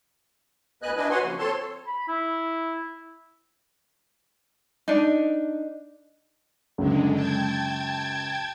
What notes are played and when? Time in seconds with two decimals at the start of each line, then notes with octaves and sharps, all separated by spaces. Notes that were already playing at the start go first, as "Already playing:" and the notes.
0.82 D2 B3 B4 D#5 G#5 F#6
0.97 D4 E4 B4 D#5 G#5
1.10 F#4 B4 C#5 F#5 G#5 C6
1.24 C#3 F3 A#3
1.39 C4 A4 C#5 A5 C6
1.87 B5
2.08 E4
4.88 D4 D#4
6.78 C#2 F#2 D3 G#3
7.12 G5 A5 G#6